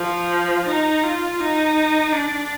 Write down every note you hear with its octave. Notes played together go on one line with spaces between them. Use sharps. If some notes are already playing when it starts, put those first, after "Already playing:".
Already playing: F3
D#4
F4
D#4
D4